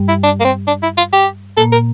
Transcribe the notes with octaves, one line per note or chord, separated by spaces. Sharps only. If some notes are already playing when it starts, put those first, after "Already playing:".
Already playing: G2 G3
E4
D4
A#3
C4
D4
E4
F4
G4
A#2 A#3 A4
A#4